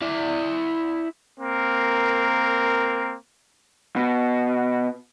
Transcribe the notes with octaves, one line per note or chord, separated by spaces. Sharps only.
E4 D5
A#3 C4 A#4
B2